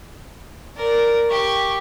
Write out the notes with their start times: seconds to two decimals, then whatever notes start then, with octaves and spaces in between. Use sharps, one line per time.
0.76 A#4 D5
1.30 G4 C#6